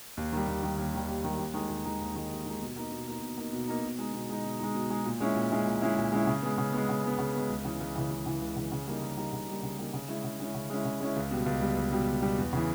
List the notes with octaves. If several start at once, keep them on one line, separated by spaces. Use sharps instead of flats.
D#2
D#3 G3
D#2
D#3 G3
D#2
D#3 G3
D#2
D#3 G3
D#2
D#3 G#3 D#4
D#2
D#3 G#3 D#4
D#2
D#3 G#3 D#4
D#2
D#3 G#3 D#4
B2
A#3 D#4
B2
A#3 D#4
B2
A#3 D#4
B2
A#3 D#4
B2
G#3 D#4
B2
G#3 D#4
B2
G#3 D#4
B2
G#3 D#4
A#2
G#3 C#4 E4
A#2
G#3 C#4 E4
A#2
G#3 C#4 E4
A#2
G#3 C#4 E4
C#3
G#3 B3
C#3
G#3 B3
C#3
G#3 B3
C#3
G#3 B3
C#2
C#3 E3
C#2
C#3 E3
C#2
C#3 E3
C#2
C#3 E3
C#3
G3 A#3 D#4
C#3
G3 A#3 D#4
C#3
G3 A#3 D#4
C#3
G3 A#3 D#4
C#3
G#3 C#4 E4
C#3
G#3 C#4 E4
C#3
G#3 C#4 E4
C#3
G#3 C#4 E4
C#2
B2 G3
C#2
B2 G3
C#2
B2 G3
C#2
B2 G3
E2
C#3 E3